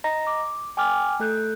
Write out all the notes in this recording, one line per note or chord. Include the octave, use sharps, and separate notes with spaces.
D#5 A#5 A#6
D6
G5 G#5 D6 F6
A3 A4 F#6 G6